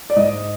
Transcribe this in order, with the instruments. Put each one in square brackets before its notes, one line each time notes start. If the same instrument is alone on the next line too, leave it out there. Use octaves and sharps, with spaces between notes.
[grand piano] D5
G#2 D#5